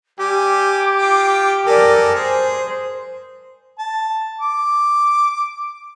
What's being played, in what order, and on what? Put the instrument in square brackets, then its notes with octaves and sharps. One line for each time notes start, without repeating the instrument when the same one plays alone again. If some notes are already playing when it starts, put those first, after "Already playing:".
[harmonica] G3 G#5 [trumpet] G4 [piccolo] D6
[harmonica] F4 G5
[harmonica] A4 G#5 F6 [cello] A#4 D5
[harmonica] G#4 [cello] C5
[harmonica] A5
D6